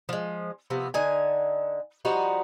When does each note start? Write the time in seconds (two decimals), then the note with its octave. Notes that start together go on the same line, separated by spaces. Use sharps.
0.09 F3 G#3
0.70 C3 F3 B3
0.94 D3 D#4 G#5
2.05 F3 G3 D#4 F#4